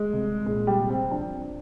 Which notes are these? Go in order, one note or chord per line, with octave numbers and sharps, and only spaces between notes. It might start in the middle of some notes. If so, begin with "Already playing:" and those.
Already playing: G#3
C2
A#2 G#3
G3
C2
C4
F3 D4